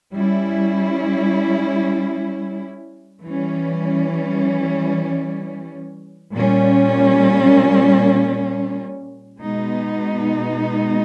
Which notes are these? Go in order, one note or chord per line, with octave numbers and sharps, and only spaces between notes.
G3 C#4 E4
E3 G3 C#4
A#2 G3 C#4
B2 G#3 B3 D#4